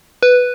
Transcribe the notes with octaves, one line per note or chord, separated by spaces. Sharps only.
B4